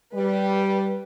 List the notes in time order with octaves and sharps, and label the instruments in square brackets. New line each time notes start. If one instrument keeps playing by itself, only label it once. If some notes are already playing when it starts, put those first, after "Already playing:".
[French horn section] G3 [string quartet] B4